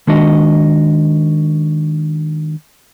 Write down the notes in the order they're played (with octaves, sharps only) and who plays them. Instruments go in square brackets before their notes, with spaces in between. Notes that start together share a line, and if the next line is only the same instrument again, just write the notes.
[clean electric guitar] D#3 G#3 D4 F#4 D#5